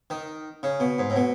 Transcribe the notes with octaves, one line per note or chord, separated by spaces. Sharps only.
D#3
C#3
B2
G#2
A2
B2